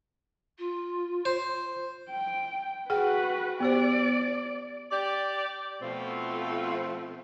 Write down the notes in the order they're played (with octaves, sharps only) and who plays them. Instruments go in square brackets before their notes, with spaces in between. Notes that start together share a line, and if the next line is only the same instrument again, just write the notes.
[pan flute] F4
[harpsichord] C5
[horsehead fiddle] G5
[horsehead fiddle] F#4 B4 [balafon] G#4 F#5 G5
[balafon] B3 G4 C5 [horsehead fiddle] D5
[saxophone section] G4 D5
B2 F3 A3 C4 F4